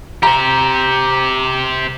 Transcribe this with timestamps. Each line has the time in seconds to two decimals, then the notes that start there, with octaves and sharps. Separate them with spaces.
0.23 G4 C5 A#5